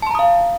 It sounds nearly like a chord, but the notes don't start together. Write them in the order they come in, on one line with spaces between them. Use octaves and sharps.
A5 C6 A#5 D#6 F5